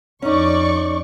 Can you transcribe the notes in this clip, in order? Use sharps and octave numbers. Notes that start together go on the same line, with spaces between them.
F2 C#4 D#4 D5 C#6